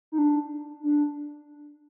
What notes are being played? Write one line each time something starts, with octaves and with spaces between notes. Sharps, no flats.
D#4
D4
D4